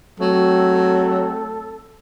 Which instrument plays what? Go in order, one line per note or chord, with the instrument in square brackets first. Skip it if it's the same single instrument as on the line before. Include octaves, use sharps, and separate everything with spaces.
[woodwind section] G#2 A3 C4 [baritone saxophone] F#3 [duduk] A4